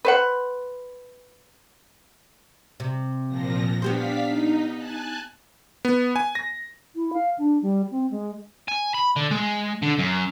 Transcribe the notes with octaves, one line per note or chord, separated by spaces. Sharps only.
B4 C5 F#5
C3
A#2 F3 A#6
B3 D4 G4 C5 F5 B6
D#4
G#5 A5 F#6
B3
G#5
A#6
E4
F5
D4
G3
C4
G#3
G#5
B5
D3
G#3
D3
F#2